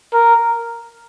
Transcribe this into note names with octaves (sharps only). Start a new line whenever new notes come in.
A#4